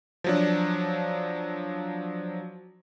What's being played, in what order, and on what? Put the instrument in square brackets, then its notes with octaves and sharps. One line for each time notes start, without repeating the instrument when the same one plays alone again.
[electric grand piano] F3 F#3 D4